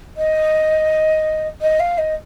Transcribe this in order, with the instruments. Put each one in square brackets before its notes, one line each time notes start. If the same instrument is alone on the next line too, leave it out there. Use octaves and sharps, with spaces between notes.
[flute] D#5
D#5
F5
D#5